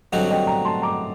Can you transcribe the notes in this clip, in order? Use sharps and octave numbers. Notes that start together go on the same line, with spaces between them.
G2 D3 F#3 C4 F#4 D#5 G5
D#5 G5
G5 A#5
A5 C6
A#5 D6